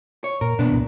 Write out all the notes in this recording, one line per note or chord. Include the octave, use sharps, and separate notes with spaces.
C#5
A#2 A#4
E2 B2 A#3 B3 D4
C2 A#2 E3